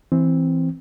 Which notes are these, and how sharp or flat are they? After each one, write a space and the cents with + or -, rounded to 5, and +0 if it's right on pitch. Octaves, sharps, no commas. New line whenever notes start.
E3 +0 C4 +0